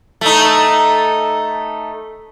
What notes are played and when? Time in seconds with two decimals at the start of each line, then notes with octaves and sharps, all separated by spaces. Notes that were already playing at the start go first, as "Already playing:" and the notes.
0.21 A3 D#4